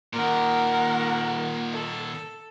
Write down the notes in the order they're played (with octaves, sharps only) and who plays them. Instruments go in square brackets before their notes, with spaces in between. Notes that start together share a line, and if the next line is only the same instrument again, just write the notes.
[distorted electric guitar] A#2 D#3 [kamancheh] A#4 F#5
[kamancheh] A4